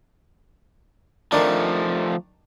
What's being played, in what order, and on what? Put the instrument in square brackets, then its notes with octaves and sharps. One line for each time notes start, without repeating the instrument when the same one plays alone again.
[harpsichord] D#3 D4 [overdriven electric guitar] F3 A3